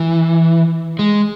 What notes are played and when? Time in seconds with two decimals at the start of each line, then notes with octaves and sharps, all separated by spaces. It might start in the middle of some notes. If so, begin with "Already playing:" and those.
Already playing: E3
0.99 G#3